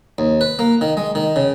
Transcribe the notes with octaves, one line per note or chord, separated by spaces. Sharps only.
D#2
B4
A#3
D#3
G#3
D#3
C#3